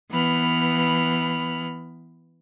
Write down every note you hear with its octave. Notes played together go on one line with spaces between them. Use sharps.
E3 B3 B5 F6